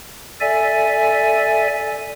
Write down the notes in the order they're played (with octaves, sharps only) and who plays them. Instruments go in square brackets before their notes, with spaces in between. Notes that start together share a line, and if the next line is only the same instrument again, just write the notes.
[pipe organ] A4 D5 E5 G#5